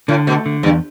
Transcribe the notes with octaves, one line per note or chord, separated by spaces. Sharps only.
A2 D3
B2 A3
D3
E2 G2